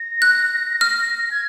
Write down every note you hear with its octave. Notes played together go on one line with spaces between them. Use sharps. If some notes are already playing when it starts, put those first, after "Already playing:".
Already playing: A#6
F#6
F6
G#6